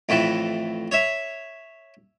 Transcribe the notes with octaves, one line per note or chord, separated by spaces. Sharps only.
F2 A2 E3
C#5 E5